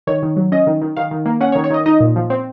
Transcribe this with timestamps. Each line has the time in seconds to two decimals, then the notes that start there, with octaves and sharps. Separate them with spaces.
0.07 D#3 C#5
0.23 D#3
0.36 F#3
0.52 C#4 D#5
0.67 D#3
0.82 D#3
0.97 D#3 F5
1.11 D#3
1.26 A#3
1.41 C#4 F#5
1.52 C#5
1.55 D#3
1.64 C#5
1.70 D#3 D#5
1.86 D#4 D#5
2.00 A#2
2.16 F3
2.30 C4